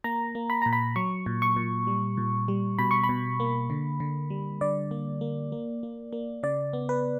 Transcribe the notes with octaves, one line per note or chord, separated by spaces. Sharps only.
A#3 A#5
A#3
B5
A#2 A#5
B5
F#3 C#6
A#2
C#6
A#2
G3
A#2
G3
B2 B5
C#6
B5
B2
A#3
D3
D3
G3
D3 D5
A#3
A#3
A#3
A#3
A#3
C#3 D5
B3
B4